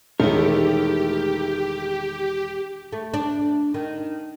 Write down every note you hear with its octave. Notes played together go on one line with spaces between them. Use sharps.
E1 D#3 A3 E4 G4 A#4
A3
D4
D#3